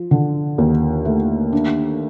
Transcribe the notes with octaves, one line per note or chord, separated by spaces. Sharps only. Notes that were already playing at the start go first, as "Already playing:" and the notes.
Already playing: F3
D3
D#2
A3
D4